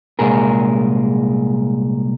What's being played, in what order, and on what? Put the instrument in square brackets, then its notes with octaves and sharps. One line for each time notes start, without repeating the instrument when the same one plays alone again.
[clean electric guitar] C2 A#2 G#3 G#4 A#4